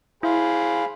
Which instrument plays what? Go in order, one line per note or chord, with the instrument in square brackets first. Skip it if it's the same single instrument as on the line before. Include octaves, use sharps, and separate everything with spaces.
[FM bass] E4 [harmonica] G#4 C5 B5 [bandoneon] F5